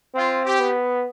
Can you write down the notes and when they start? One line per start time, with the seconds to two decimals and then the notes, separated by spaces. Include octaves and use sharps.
0.15 C4 F4
0.44 G4
0.60 B3